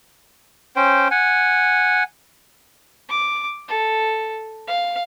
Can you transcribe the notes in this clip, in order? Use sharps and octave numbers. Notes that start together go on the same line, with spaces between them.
C#4 C5 G5
F#5 G#5
D6
A4
F5